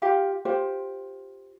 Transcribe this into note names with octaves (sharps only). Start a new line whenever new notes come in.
F4 G4 F5
F4 G4 C5